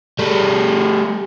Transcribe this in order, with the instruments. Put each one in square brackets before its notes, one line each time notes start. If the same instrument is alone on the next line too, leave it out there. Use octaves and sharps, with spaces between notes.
[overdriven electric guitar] G3 A3